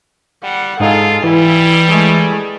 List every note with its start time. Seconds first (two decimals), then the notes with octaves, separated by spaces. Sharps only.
0.43 G3 F#5
0.80 G#2 D#4 F4 G#4 A4 F5
1.24 E3 G3 E4
1.88 G#3 A3